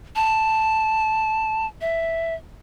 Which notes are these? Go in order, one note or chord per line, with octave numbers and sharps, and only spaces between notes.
A5
E5